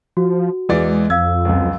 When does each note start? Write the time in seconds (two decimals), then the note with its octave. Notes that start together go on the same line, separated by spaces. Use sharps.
0.17 F3 F#4
0.69 E2 E3 G#3 D5
1.10 F2 F5 E6 G#6
1.45 C#2 F#2